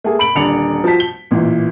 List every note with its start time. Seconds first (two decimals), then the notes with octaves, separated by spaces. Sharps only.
0.04 A3 A#3 G#4
0.19 B5 D7 F#7
0.35 D#1 D3 D4 C#7 F7
0.84 F3 F#4 A5 B6
1.00 G7
1.31 A1 A#2 E3